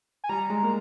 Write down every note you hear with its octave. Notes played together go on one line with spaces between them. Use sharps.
G#5
G3 A#5
G#3
A#3